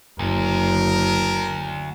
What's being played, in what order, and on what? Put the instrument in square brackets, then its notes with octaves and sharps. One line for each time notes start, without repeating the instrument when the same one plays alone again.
[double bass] F#1 [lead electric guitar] D2 [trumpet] A#4